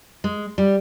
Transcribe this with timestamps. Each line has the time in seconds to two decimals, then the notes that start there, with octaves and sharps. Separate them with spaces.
0.24 G#3
0.58 G3